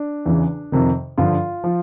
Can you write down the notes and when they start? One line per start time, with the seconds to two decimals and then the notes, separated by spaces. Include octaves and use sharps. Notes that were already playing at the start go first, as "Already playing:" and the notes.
Already playing: D4
0.26 E2 C#3 E3
0.72 F2 C3 D#3
1.18 G2 D3 F3 F4
1.64 F3